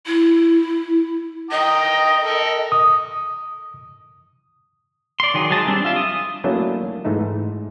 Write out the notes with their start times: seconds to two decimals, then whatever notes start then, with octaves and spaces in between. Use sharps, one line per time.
0.06 E4
1.51 D#5 G5 A#5 D#6
2.23 A4 A#4
2.72 D#6
5.20 D5 C6
5.34 D#3 F#3 G#4
5.50 F#3 G#3 G#4 A5
5.67 G3 C4 D4
5.85 F4 E5
5.96 D#6
6.44 F#3 A3 A#3 C#4 D4 E4
7.05 G#2 E3 A3 D#4